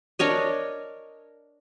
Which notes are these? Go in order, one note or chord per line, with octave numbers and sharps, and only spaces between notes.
D4 A#4 C#5 D#5